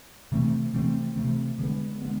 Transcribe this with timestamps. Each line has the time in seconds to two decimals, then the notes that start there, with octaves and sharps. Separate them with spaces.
0.32 C3 E3 A3 C4
0.74 C3 E3 A3 C4
1.16 C3 E3 A3 C4
1.59 D3 G#3 B3
2.02 D3 G#3 B3